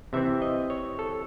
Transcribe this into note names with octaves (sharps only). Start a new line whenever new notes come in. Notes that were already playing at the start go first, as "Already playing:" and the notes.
C3 E3 C4 E5
D#5
C#5
A4